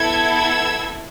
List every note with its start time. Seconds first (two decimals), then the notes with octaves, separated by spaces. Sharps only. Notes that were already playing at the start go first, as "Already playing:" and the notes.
Already playing: B3 E4 A4 E6 G#6
0.36 E6 G#6